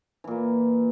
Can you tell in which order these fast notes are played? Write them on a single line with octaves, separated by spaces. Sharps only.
E3 A#2 A#3